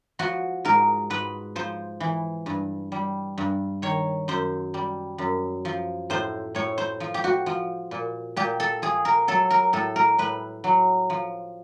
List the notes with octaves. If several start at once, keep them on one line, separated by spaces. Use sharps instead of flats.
F3 F#4
G#2 A#4
G#2 B4
F3 C5
E3
G2
G3
G2
D#3 C#5
F#2 C5
G3
F#2
F3
A2 C5
A2 C#5
C5
F3
G4
F#4
F3
A#2
A#2 G4
A4
F3 G#4
A#4
F#3 A4
A#4
A2 A4
A#4
A2 B4
F#3
F3